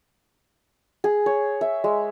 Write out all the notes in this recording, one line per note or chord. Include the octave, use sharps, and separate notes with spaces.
G#4
C#5
E5
G#3